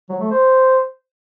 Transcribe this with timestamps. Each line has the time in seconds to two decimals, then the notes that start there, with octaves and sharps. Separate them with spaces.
0.09 F#3
0.20 A3
0.31 C5